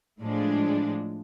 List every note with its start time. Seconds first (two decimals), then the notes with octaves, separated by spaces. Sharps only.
0.20 A2 F3 G#3 D4